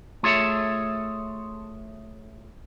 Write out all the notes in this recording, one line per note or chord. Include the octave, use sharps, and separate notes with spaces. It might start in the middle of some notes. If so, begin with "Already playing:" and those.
A3 F4 G#4 A4 C#5 E5